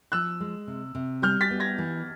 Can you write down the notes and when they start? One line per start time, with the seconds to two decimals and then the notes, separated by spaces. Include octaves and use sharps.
0.12 F3 E6 F#6
0.41 G#3
0.67 C3
0.95 C3
1.22 G3 F6 G6
1.41 A6 B6
1.51 B3
1.60 G#6 A#6
1.78 E3